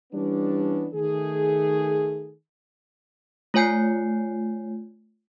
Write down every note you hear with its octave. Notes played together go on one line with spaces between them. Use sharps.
E3 G3 B3 C#4 D4
D#3 A3 G#4
A3 F4 C#5 G#5 G6 C7